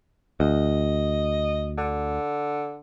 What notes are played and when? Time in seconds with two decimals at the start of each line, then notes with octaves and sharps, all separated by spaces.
0.40 D2 D#5
1.78 D3